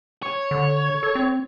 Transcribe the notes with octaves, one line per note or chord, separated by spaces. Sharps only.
C#5
D3
A4
C4